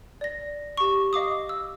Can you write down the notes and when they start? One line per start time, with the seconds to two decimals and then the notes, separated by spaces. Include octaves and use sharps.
0.21 D5 A#6
0.77 G4 C#6
1.13 D#5 F5 D6 D#6
1.49 E6